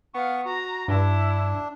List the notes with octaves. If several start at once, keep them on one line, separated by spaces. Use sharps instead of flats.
B3 F5 C#6
F#4 A#5
G2 D4 E4